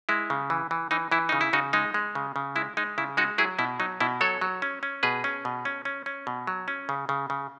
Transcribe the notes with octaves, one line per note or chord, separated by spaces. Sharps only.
G#3 E4
C#3
E3
E3
E3 D#4
E3 E4
C#3 D#4
E4
C#3 D#4 F#4
G#3 D#4
G#3
C#3
C#3
G#3 E4
G#3 D#4
C#3 E4
G#3 D#4 F#4
F#3 E4 G#4
B2 E4
F#3 D#4
B2 E4
F#3 A4 C#5
F#3
C#4
C#4
B2 G#4 B4
C#4
B2
C#4
C#4
C#4
B2
F#3
C#4
C#3
C#3
C#3